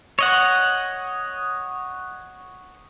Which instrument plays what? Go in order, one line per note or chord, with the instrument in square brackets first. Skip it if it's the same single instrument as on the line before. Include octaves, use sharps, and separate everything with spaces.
[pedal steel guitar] C#5 D#5 F#5